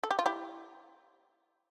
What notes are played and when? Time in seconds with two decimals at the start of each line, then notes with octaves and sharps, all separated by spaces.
0.03 A4
0.11 G4
0.19 F4
0.26 E4 G4